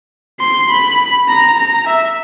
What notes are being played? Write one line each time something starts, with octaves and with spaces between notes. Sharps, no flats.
C6
B5
A#5
A#5
E5